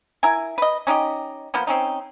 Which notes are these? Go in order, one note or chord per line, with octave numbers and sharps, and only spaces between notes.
E4 A#4 G#5
B4 D#5
C#4 D#4 G4 D#5
F3 A#3 B3 C5
C4 C#4 D#4